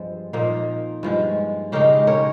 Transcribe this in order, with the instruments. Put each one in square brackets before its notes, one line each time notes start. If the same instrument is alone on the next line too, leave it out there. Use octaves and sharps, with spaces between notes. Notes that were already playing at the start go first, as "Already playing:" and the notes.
Already playing: [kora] G2 F3 G#3 C4
A#2 F3 A#3 D#4
G2 F3 G#3
C#3 G#3 D#4 G4 A#4
A#4 C#5